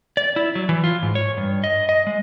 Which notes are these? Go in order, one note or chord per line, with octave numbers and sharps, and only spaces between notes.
D5
E4
F#3
E3
F4
G#2
C#5
G2
D#5
D#5
G#3